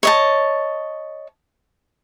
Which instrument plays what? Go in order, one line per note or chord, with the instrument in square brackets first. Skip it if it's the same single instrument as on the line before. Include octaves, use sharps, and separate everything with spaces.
[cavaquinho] C#5 D#5 A5